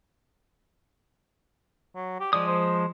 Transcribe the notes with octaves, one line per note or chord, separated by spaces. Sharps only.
F#3
G4
F3 G#3 D5 D#6
C5